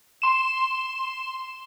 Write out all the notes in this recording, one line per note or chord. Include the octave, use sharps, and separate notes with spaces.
C6 E7